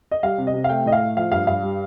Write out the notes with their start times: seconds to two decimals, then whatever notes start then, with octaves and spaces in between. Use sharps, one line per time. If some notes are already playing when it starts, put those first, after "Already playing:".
0.11 D#5
0.23 G3 F5
0.38 C3
0.47 D#5
0.54 C3
0.64 F5
0.69 A3 G5
0.85 A2 D#5
0.92 F5
1.01 A3
1.17 F3 F5
1.31 G2 F5
1.47 G2 F5
1.63 G3